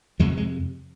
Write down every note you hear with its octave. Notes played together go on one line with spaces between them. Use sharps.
F2 C3 F3 G#3
G#3